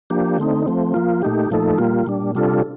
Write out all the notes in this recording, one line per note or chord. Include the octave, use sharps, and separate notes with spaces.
F3 A#3 D4 G4
D3 A3 C4 D#4
F3 A3 C4
F3 A#3 F4
A#2 A3 D#4 G4
A#2 F3 A3 D#4 A4
A#2 G3 A#3 F4
A#2 G3 D4
C3 G3 D4 F4 A4